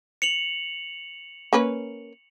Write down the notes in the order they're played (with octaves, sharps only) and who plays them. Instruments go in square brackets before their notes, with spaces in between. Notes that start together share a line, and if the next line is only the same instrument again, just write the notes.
[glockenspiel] C#7 F7 F#7
[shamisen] A#3 C#4 B4